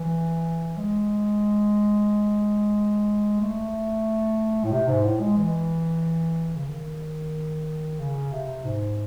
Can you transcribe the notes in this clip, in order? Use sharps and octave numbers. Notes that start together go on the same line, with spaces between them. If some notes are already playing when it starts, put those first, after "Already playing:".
Already playing: E3
G#3
A3
A2
C3
G#2
A2
G#3
E3
C#3
D#3
C#3
C3
G#2